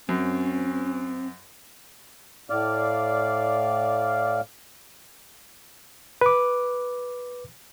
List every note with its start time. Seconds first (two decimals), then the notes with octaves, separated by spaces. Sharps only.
0.09 F#2 C4 C#4
2.50 A2 D5 F5
6.21 B4 D6